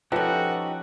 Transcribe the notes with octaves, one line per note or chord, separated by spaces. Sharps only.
F3 C#4 D#4 F#4 G4 A4 B4 F#5